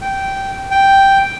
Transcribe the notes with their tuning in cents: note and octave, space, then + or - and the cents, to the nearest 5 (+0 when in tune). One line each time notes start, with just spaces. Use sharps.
G5 -10
G5 +0